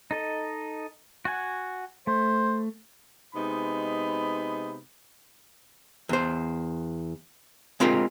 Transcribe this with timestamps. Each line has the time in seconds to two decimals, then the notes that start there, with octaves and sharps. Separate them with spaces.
0.11 D#4 A4 D#5
1.25 F#4 F#5 G#5
2.07 A3 C5
3.35 C3 G#3 B3 D#4 B5
6.09 E2 C5
7.80 G#3 C4 F4 G4 A#4